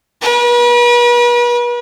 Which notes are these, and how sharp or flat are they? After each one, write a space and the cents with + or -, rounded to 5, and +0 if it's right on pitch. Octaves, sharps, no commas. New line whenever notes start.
B4 -40